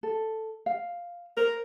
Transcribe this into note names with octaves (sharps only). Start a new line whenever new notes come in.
A4
F5
A#4 C5